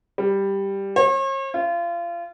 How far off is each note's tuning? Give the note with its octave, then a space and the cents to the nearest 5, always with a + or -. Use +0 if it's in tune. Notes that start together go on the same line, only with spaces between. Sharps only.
G3 +5
C#5 -45
F4 -30